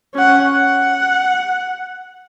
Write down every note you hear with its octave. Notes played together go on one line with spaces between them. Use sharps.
C#4 F#5
F#5